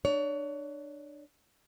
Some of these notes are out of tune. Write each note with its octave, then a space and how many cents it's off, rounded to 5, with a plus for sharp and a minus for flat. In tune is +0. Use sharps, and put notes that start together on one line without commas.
D4 +25 C#5 +30